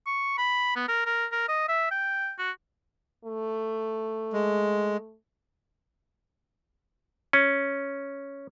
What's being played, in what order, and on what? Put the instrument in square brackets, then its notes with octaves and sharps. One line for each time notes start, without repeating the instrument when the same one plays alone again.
[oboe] C#6
B5
B3
A#4
A#4
A#4
D#5
E5
G5
F#4
[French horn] A3
[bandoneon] G#3
[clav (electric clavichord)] C#4